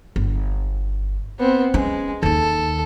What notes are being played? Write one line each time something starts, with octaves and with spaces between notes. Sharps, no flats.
G1
B3 C4
G#3 C#4
D#2 D#3 A4